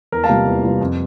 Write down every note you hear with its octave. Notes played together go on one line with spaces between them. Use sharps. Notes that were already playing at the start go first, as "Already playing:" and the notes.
E2 A#4
F5 A5
C3 G3 A#3 F4
E2
C3 G3 A#3 F4
F2